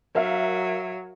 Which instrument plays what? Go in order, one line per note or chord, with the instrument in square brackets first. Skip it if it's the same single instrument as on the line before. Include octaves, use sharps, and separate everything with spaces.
[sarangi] F#3 [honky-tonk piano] A#4 E5 F5